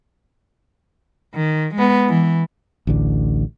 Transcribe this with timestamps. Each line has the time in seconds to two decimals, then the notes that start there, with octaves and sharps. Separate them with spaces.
1.34 D#3
1.75 G#3 B3
2.08 E3
2.87 A1 D2 D3